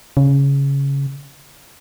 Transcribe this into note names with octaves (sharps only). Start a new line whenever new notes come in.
C#3